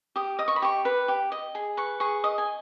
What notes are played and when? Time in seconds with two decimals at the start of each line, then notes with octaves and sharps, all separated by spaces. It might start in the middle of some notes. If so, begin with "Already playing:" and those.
0.16 G4 D#6
0.39 D#5 D#6
0.48 C#6
0.56 B5
0.62 G4 C#6
0.85 B4
1.08 G4
1.32 D#5
1.55 G#4
1.77 B4 C#6
2.00 G#4 C#6
2.24 D#5 D#6
2.38 G#5